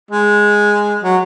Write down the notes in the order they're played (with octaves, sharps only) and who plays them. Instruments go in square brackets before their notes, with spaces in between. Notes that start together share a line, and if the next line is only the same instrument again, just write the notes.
[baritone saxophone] G#3
F#3